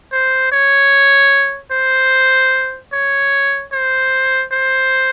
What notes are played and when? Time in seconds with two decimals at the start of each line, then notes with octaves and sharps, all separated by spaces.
0.12 C5
0.52 C#5
1.72 C5
2.93 C#5
3.73 C5
4.52 C5